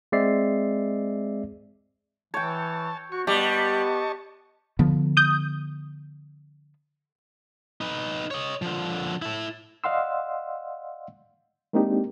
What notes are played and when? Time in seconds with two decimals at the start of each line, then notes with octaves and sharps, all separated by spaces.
0.12 G#3 C4 D5 E5 C7
2.34 E3 C#5 G5 A5
3.12 F#4 C#6
3.27 G3 B3 G4 D#5 A5 C#6
4.79 D3 F3 B3
5.17 D#6 G6
7.81 D#4 B4
8.31 C#5 D#5
8.62 D3 F3
9.22 E4 A4
9.84 D5 D#5 F5 F#5 C6 E6
11.73 G#3 A#3 C4 D4 D#4 G4